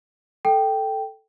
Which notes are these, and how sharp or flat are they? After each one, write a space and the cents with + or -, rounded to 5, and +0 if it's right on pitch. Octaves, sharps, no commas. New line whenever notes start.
A4 +0 G5 -5